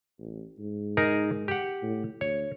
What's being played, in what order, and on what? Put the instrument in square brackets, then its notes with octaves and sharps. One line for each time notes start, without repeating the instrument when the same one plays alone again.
[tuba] A1
G#2
[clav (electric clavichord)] D#4 G#4 A#4
G4 F#5
[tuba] A2
[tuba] D2 [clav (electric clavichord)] C#5